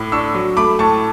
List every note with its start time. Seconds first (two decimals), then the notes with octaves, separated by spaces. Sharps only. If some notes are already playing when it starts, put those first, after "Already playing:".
Already playing: A2 D6
0.12 D4 C#6 E6
0.34 F#3
0.57 A3 B5 D6
0.79 A2 A5 C#6